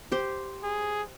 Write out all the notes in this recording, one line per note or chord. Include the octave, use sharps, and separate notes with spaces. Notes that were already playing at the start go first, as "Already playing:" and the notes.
G4 C5
G#4